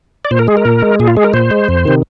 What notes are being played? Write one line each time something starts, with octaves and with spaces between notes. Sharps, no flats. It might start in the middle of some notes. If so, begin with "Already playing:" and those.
D5
A#2 C5
A#4
G#3 G#4
A#4
A#2
G#3
A#2 G#4
F4
G#3 G#4
A#4
A#2 C5
G#3
F2
C3 D#3